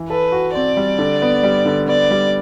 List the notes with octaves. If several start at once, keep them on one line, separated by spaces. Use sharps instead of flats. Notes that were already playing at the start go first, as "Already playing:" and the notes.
Already playing: E3
A4 B4
F#4
C4 D5
G3
D3
B3
G3
D3
B3 D5
G3